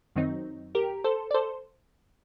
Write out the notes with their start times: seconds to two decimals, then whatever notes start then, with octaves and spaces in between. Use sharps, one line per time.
0.16 F#2 D#3 F#3 C4 D#4
0.75 G4 A#4
1.04 A4 C5
1.31 D5
1.34 A4 C5